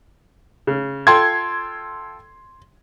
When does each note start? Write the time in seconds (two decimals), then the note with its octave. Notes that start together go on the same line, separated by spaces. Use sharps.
0.67 C#3
1.07 F4 A4 G5 C6 G#6